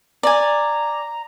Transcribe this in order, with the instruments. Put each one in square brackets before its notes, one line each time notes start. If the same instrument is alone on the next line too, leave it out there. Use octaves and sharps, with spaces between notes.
[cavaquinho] D5 G#5 [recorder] A#5